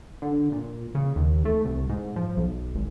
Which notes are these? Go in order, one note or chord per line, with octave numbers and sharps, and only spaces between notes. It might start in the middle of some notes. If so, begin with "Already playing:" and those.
D3
A#2
C#3
D#2
A3
C2
G#2
F3
B1
G#1